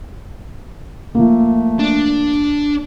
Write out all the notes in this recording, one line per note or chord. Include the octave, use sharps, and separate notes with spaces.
F3 A3 A#3
D4